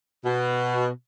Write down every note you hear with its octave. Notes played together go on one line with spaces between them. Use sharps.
B2